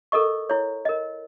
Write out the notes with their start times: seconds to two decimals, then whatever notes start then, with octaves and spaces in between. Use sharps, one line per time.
0.12 A4 A#4 D#5 C#6
0.50 E4 C#5
0.85 A#4 D#5